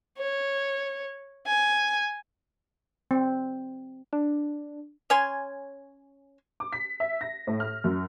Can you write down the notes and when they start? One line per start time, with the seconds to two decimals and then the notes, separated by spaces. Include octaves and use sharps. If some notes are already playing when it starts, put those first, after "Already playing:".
0.18 C#5
1.47 G#5
3.11 C4
4.13 D4
5.10 C#4 C#5 G#5 C6
6.60 D6
6.73 B6
7.00 E5
7.21 A#6
7.47 A2
7.60 F6
7.84 F#2